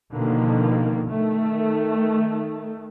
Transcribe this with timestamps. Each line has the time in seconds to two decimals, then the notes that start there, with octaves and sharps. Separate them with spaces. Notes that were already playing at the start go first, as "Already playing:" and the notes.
0.13 B2 D3 D#3 F3 A#3
1.07 D#3 A3